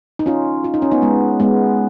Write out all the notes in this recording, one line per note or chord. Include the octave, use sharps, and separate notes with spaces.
D#4
C#4 F4
F4
D#4
C#4
B3 D#4
G#3 B3
G#3 B3